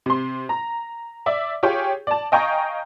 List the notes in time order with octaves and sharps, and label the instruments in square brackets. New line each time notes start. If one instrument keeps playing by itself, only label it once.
[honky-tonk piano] C3 C6
A#5
D5 E5 D6
F4 G4 G#4 C#5 G5
D5 A5
D#5 F5 G5 G#5 A#5 C#6